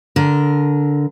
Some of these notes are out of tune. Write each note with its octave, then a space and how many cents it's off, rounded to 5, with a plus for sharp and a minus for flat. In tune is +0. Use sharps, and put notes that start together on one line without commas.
D3 -15 A#4 +0